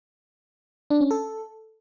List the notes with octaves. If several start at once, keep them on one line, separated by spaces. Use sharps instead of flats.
D4
C#4
A4